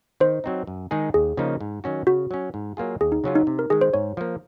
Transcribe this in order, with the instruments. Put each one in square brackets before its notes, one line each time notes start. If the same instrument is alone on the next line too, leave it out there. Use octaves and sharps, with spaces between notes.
[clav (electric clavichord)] D#3 [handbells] C5
[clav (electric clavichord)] F#3 C4 D#4
F#2
D#3 G#3 D#4 G#4
[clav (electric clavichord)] D#2 [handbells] G#4
[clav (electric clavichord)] C#3 F3 A#3 D#4
G#2
D#3 F#3 C#4 F#4
[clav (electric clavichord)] C#3 [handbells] F#4
[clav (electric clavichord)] F#3 C#4
G#2
F#3 A#3 F4 G#4
[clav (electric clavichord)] D#2 [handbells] G#4
[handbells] D#4
[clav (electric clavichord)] C#3 F#3 C#4 F4
[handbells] D#4
[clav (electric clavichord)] C3
[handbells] A#4
[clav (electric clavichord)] D#3 G#3 [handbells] G#4
[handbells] C5
[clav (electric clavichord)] G#2 [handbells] C#5
[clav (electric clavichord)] F3 A#3